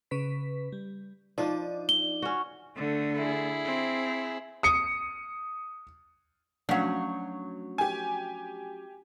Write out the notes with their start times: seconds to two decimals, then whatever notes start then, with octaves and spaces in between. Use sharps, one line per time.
0.11 C#3 B4 B6
0.72 G3
1.38 F3 D4 D#4 D5
1.89 G7
2.22 C#4 F#4
2.76 D3 A3
3.17 E4 G#4
3.65 C4
4.63 D#6 C#7
6.69 F3 F#3 A3 C#4 D4 D5 F5 F#5
7.78 G4 G#5